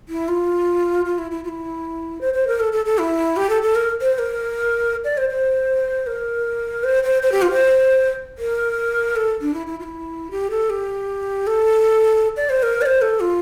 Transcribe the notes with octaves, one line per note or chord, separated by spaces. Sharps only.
E4
F4
F4
E4
E4
F4
E4
C5
C5
A#4
A4
A4
A4
E4
G4
A4
A4
A#4
C5
C5
A#4
D5
C5
C5
A#4
C5
C5
C5
G4
F4
C5
A#4
A4
D4
E4
E4
F4
E4
G4
A4
G4
A4
D5
C5
A#4
D5
C5
A4
F4